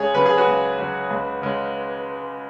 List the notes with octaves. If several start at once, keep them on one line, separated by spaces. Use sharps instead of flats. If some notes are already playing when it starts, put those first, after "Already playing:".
Already playing: C#2 G#4 C#5
C#3 F#3 B4
G#4
F#4 B4
C#2
C#3 F#3
C#2
C#3 G#3